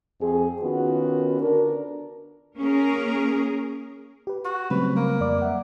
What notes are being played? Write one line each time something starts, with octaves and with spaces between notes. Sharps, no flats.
F2 C4 G#4
D#3 B3 C#4 F4 F#4
D3 D4 A#4
A#3 C#4 G#4 A#4
G4 B4
F#4
C#3 F#3 G3 A3 C4 B4
A#3
F2 D5 D6
E5 F#5